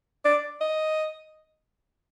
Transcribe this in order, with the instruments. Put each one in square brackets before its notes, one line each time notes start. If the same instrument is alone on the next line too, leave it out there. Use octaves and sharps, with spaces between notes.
[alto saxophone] D5
D#5